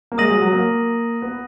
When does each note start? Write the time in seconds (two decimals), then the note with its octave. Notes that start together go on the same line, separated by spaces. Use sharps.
0.12 A#3
0.18 G#3 D#6 A#6 D#7 F#7
0.30 F#3
0.41 F#3
0.53 A#3
1.22 B3